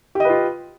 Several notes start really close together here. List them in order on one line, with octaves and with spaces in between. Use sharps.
G4 D#5 B4 F4